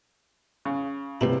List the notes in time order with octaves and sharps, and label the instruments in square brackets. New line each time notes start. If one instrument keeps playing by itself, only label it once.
[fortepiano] C#3
[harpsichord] A1 G2 E4 [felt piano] C3